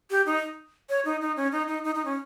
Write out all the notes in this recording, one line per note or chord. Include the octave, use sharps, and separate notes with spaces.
G4
D#4
C#5
D#4
D#4
C#4
D#4
D#4
D#4
D#4
C#4